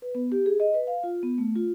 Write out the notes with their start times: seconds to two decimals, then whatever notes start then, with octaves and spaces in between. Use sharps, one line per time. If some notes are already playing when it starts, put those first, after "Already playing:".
0.02 B4
0.15 B3
0.32 G4
0.46 G#4
0.60 D#5
0.74 B4
0.87 F5
1.04 F4
1.23 B3
1.38 A3
1.56 F4